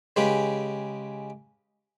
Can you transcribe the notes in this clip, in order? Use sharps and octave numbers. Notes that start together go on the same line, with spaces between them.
C#3 G#3 G4 B4